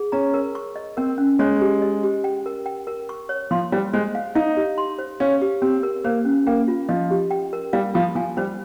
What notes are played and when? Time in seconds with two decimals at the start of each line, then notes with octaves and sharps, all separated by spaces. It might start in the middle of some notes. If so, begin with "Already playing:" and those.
Already playing: G#4
0.12 C#4 A#5
0.34 A#4
0.55 C#6
0.76 D#5
0.97 C4 A#4
1.18 C#4
1.39 G#3 C#5
1.61 G4
1.82 D#5
2.03 G4
2.24 G5
2.46 A#4
2.66 G5
2.87 A#4
3.09 C#6
3.29 C#5
3.51 F3 C6
3.72 G3 C5
3.93 G#3 C5
4.15 F5
4.35 D#4 F5
4.57 G4
4.78 C6
4.99 C5
5.20 C#4 F5
5.42 G4
5.62 C4 G4
5.83 A#4
6.04 A#3 C5
6.25 C#4
6.47 A#3 G5
6.68 F4
6.89 F3 D#5
7.11 G4
7.31 G5
7.53 A#4
7.73 G3 F5
7.94 F3 F4
8.15 F3 G#5
8.37 G3 C5